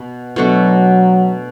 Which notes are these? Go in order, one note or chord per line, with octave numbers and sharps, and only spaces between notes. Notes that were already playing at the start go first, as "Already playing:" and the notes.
Already playing: B2
B2 F#3 A3 D4 F#4